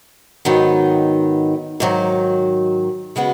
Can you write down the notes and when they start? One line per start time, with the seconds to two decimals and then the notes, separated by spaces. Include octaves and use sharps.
0.45 G#2 D#3 F#3 B3 D#4
1.80 G#2 D#3 F#3
3.16 C#3 G#3 B3 F#4